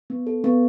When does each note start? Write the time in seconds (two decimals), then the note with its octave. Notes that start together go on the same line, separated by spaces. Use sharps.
0.10 B3
0.27 A4
0.44 B3